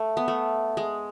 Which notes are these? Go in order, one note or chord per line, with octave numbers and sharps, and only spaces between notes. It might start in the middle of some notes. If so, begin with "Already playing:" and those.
Already playing: A3
B3
A3
G#3